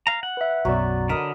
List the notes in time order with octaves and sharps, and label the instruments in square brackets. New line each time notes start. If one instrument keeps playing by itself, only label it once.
[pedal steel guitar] F5 A#5
F#5
[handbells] B4 E5
[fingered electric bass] B1 F#2 B2 [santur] F#3 [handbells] F#4 D5
[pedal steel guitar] D3 [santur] A#4 D#5 B5 [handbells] B6